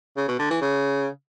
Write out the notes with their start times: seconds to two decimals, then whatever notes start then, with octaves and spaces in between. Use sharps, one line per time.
0.17 C#3
0.28 B2
0.39 D3
0.50 E3
0.61 C#3